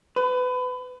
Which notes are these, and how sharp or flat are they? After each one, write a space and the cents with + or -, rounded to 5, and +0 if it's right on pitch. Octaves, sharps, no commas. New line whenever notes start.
B4 +30